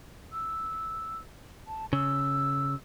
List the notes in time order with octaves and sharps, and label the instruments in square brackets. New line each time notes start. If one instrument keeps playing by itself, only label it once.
[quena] E6
A5
[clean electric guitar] C#3 [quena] E6